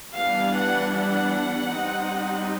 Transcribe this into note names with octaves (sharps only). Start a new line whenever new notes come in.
E3 G3 B3 D4 F5
F#5
F#5
G3 C4 D#4